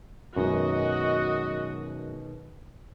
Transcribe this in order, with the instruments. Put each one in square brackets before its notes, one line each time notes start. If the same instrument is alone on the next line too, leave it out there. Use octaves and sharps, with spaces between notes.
[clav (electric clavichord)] F#2 [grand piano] B2 D#3 G#3 [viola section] F#4 D#5